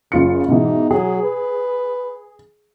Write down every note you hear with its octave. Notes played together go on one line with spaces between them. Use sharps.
F#1 C#3 F4 C#7
G#2 B2 E3 D#4
F#3 G#4
B4